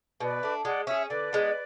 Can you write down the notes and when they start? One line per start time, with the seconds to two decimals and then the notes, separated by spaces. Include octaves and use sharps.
0.20 B2 B4 D5
0.43 A3 D4
0.65 G#3 D5 F#5
0.87 C#4 G#4 C#5 E5
1.09 D3 B4 D5
1.33 G#3 B3